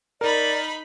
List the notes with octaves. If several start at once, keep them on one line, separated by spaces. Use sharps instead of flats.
D#4 A#4 D5 B5